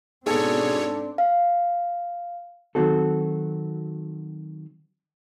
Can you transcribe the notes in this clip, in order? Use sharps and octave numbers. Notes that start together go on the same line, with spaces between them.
G#2 B2 C4 D4 G#4 A4 C#5 C#7
F5
D#3 F#3 C4 F#4 A4